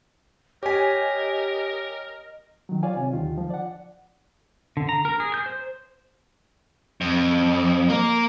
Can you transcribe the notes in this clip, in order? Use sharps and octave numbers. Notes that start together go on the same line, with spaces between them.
G4 A#4 C#5 D#5 G#5 B6
D#3 F#3
F4 C#5 D5 F5 G#5
C3
D#2 D3 D#3 F4
F3
D5 F#5
D3
A#5
A#4
G#4
G6
C5
F2
A#3 A#4